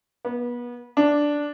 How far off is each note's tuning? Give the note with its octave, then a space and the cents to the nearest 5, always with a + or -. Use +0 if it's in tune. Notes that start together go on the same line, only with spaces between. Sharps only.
B3 -30
D4 -5